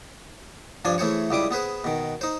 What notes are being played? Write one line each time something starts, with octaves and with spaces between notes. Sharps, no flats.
G2 F3 D4 G#5 C6
E3 A3 G#4 C5 C#5
C#2 G3 E4 D6 D#6
B3 G#4 B4 C5
B2 D#3
D#4 C5